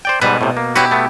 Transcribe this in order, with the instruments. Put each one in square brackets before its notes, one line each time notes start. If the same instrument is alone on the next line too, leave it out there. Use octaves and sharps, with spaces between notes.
[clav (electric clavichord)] C5 D5 G5
[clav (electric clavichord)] G#2 G3 B4 [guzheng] B2
[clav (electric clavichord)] A2 C3
A#3
[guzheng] E4 G4 [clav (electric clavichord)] F#4 B4 C#5
[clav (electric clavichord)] A3 B3